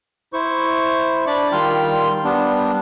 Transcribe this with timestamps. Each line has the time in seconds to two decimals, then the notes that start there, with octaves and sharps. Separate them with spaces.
0.33 E4 C5 C#6
1.27 D4 D5 B5 D6
1.52 D#3 G3 F4 G5 C6 F6
2.24 G3 B3 D4